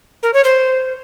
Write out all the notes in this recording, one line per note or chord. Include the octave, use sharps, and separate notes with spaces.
A#4
C#5
C5